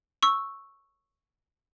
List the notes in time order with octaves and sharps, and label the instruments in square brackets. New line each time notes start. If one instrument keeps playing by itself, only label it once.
[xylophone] C#6 E6